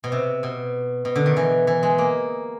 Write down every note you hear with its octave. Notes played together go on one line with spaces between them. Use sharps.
B2
C3
B2
B2
D3
D#3
E3
E3
G#3
A#3